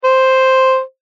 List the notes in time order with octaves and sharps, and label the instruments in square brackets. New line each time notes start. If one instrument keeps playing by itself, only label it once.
[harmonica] C5